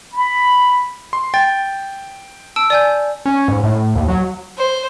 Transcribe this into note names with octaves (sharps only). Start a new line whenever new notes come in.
B5
C6
G5 A6
A5 E6 D7
D5 G#5 G6
C#4
G#2
A2
D#2
F#3
C5